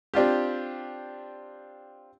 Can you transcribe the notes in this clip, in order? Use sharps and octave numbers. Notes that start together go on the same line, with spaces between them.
C4 D4 F4 G4